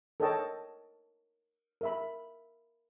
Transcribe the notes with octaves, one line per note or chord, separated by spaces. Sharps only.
A4 A#4 C#5 D#5 G5 A5
A#4 E5 B5